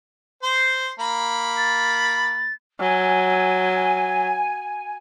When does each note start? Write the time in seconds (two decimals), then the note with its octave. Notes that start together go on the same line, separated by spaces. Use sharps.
0.43 C5 C6
1.00 A#3 B5
1.57 A6
2.80 F#3 G#5